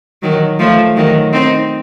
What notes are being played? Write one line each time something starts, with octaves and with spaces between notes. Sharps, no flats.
D#3 F#3
F3 A3
D#3 F#3
C4 D#4